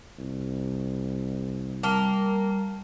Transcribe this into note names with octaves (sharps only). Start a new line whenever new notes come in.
C2
G3 A#3 A#4 A5 F6 G7